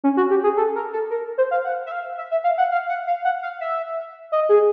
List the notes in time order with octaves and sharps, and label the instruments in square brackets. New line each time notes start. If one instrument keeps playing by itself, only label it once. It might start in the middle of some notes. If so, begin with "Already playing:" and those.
[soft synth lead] C#4
F#4
G4
G#4
A4
A#4
A4
A#4
C5
F5
F#5
E5
F5
E5
E5
F5
F#5
F5
F#5
F5
F#5
F5
E5
D#5
G#4